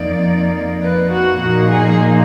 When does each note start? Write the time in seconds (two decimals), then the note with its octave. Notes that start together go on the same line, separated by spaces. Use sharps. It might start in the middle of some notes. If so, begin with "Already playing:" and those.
Already playing: F2 F3 A#3 D#4 D5
0.83 B4
1.11 F#4
1.40 A#2 F3 A#3 D#4 F#4
1.70 G#4